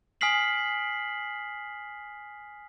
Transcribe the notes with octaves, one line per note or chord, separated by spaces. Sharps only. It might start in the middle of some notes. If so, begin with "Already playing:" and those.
G#5 D#6 F6 B6 C7 F#7